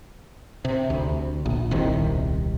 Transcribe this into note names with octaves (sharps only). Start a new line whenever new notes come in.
C3
D2
A#1
D#1 C2 C3 D#3